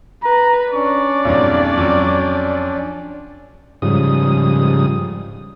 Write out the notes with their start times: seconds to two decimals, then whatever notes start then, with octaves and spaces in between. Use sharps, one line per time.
0.23 B4 A#5
0.73 C#4 D4 D5 C#6
1.25 B1 F2 G#2 C#5
1.77 F2 F#3
3.82 G#2 C#3 F3 G3 D#6